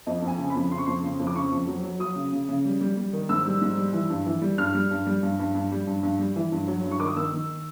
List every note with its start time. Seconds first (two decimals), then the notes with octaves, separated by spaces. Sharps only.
0.07 F2 D#5
0.22 F2
0.28 G#5
0.38 C#3
0.50 B5
0.55 F2
0.71 C#3 C6
0.78 C#6
0.86 F2 C6
1.03 C#3
1.19 F2
1.27 D6
1.35 C#3 C#6
1.51 F2
1.67 F#3
1.84 F#3
2.00 F#3 D#6
2.16 C#3
2.32 C#3
2.49 C#3
2.65 G3
2.81 G3
2.97 G3
3.13 D#3
3.29 G#2 E6
3.45 G3
3.61 G#2
3.77 G3
3.93 E3
4.10 G2
4.26 E3
4.42 G3
4.58 G2 F6
4.74 G3
4.91 G2
5.07 G3
5.23 G2
5.39 G2
5.55 G2
5.72 G3
5.87 G2
6.03 G2
6.19 G3
6.36 E3
6.52 G2
6.67 F#3
6.84 G2
6.91 C#6
7.00 D#3 D6
7.08 D#6
7.16 D#3 E6
7.33 D#3